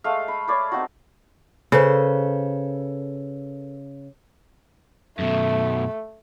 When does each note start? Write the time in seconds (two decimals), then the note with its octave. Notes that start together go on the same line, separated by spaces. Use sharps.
0.04 G#3 A3 F5
0.28 B5
0.48 C#5 D5 B5
0.72 C4 D#4 F#4
1.72 C#3 A4 B4 C5
5.19 F#2 B2 A3